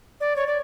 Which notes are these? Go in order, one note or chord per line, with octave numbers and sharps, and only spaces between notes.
D5
C#5
D5